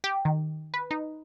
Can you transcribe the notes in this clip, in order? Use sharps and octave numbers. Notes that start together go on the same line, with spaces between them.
G4
D#3
B4
D#4